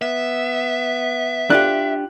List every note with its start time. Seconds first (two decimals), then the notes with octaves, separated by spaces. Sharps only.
0.02 B3 E5
1.50 D4 F4 G4 F#6